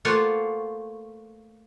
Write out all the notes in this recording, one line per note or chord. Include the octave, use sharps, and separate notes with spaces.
A3 A#3 F4 C5 C#5 F#5